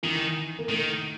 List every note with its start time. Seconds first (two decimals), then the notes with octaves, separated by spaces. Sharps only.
0.03 D#3 E3
0.59 A#3
0.69 D#3 A3